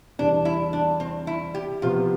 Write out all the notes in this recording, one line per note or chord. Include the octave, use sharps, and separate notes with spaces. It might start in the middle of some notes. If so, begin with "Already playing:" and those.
E2 C3 G3 D4
E4
D4
C4
E4
G4
C3 F3 B3 F4